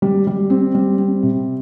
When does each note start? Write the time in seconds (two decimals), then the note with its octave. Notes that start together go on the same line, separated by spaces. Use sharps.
0.02 G3
0.27 G3
0.50 C4
0.75 G3
0.98 C4
1.23 C3